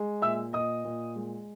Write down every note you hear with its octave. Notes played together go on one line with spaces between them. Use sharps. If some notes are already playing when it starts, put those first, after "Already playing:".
Already playing: G#3
A#2 E5 E6
A#2 D#5 D#6
A#2
G#3